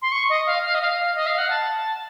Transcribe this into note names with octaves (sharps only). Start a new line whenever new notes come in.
C6
C#6
D#5
F5
F5
D#5
F5
D#5
F5
F#5
A5